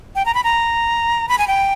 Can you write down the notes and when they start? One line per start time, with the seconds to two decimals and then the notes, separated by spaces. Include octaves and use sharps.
0.15 G5
0.26 A#5
0.34 B5
0.44 A#5
1.29 B5
1.38 G#5
1.48 G5